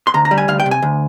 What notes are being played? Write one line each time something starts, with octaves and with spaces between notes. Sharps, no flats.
C6
D2 A#5
A#5
G3
G#5
D2 F5
G5
C3
G#5
D2